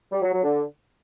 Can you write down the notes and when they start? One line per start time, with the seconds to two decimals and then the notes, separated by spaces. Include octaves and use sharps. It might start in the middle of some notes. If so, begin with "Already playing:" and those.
0.12 G3
0.22 F#3
0.32 F#3
0.42 D3